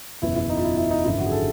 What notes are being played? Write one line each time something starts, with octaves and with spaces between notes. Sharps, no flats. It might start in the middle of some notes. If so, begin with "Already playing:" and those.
F#1 E2 B2 E4
E4
D#4
F4
E4
E4
D#4
G#1 F#2 D3 F3 E4
F#4
G#4
A4